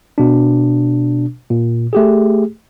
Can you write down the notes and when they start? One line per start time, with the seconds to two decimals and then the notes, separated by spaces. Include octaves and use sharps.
0.18 B2 D4
1.50 A#2
1.93 A3 G4 G#4